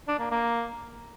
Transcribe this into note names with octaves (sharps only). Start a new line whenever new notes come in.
D4
A#3
A#3